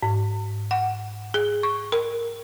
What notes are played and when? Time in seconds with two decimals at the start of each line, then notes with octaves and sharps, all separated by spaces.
0.02 G#2
0.71 F#5
1.34 G#4
1.63 C#6
1.92 A#4